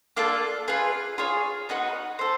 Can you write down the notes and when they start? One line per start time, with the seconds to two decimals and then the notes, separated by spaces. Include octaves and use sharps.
0.17 A#3 D4 F4 A4
0.68 F4 G#4 B4
1.18 F4 G#4 C#5
1.69 B3 D#4 F#4 B4
2.19 A4 C5